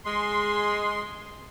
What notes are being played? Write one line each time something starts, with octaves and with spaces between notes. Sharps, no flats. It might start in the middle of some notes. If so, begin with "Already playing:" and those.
G#3 C6